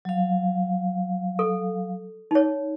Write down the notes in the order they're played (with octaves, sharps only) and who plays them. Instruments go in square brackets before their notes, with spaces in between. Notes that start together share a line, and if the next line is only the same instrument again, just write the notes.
[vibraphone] F#3 F5
[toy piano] A4
D#4 C#5